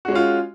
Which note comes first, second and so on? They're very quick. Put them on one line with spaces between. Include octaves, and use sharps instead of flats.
F#4 G#3 C#4 F4